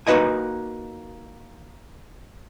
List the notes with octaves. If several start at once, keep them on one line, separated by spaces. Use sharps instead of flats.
A#3 D#4 F#4 B4 D#5 G#5